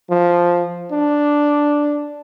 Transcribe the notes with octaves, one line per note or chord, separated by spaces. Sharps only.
F3
D4